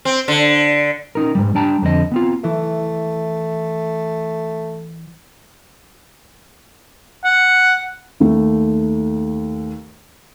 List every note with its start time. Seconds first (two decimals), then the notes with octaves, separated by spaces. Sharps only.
0.05 C4
0.28 D3
1.15 C#4 D#4 A#4
1.35 G#2 B2 G3
1.55 G3 D4 G5 A5 A#5
1.82 F2 D3 C4 D4 D#5
2.12 B3 C4 F4
2.44 E3 A3
7.25 F#5
8.20 D#2 A3